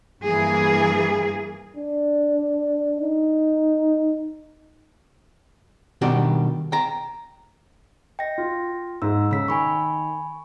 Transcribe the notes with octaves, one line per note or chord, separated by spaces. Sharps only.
G2 E3 A#3 G#4
D4
D#4
B2 D#3 G3 D4 F#4 G4
G5 A#5
D#5 G5 A#6
F4
G#2 E6
C#3 E6 B6
D#3 G#5 B5 C#6